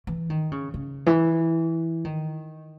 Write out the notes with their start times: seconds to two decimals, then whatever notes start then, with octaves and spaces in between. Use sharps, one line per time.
0.07 E3
0.30 D#3
0.52 C#3
0.74 C#3
1.06 E3
2.05 D#3